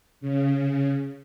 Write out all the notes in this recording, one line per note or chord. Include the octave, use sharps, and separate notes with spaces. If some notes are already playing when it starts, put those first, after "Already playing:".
C#3